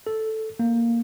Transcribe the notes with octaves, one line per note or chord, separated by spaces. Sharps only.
A4
A#3